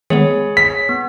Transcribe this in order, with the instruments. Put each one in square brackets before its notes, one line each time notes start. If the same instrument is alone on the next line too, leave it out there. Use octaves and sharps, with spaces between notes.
[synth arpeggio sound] D#3 G#3 B3 [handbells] G#4 C#5
[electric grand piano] B6
[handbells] B3